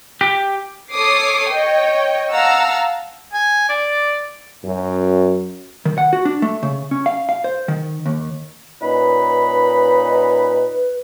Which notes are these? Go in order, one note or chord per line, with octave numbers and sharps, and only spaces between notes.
G4
A4 C#5 D6 D#6 C7
C#5 D#5 G5
F5 F#5 A5 A#5 E6
G#5
D5
F#2
D#3
F#5
F#4
D4
A3
C#3
C#4
F5
F5
C5
D#3
D#2
A#2 C#4 D#4 B4 B5